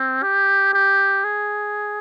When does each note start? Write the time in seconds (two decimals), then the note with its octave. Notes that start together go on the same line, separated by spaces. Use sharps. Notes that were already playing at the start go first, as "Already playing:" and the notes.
Already playing: C4
0.22 G4
0.73 G4
1.24 G#4